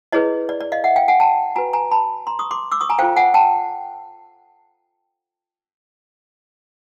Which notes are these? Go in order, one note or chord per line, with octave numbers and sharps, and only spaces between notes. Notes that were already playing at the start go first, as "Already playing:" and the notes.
E4 G#4 B4 C#5 D#5
D5
D5
D#5 F5
E5 F#5
F5 G5
F#5 G#5
G5 A5
F#4 B4 G#5 A#5
G#5 A#5
A5 B5
A#5 C6
C#6 D#6
C6 D6
D6 E6
C#6 D#6
G#5 A#5
F4 A4 C5 F5 G5
F#5 G#5
G5 A5